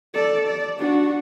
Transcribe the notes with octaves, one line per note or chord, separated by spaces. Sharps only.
A4 D5
D5
D4 F#4